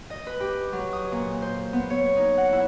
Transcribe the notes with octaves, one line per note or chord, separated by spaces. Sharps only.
D#5
B4
G4
F#3
D#6
A#2
C5
B3
C#5
D#4
F#5
E4